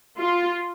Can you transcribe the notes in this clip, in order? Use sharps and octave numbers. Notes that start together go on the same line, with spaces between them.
F4